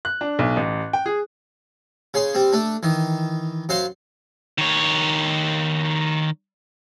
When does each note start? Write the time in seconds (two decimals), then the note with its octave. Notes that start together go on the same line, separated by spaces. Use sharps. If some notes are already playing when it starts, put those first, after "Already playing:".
0.05 F#6
0.21 D4
0.39 B1
0.57 A1
0.93 G5
1.06 G#4
2.14 C#3 G#4 C6
2.35 G3 C4
2.53 A3 D4
2.83 D#3 E3
3.69 F#2 C5 F5 F#5 C6
4.58 D#3 C#5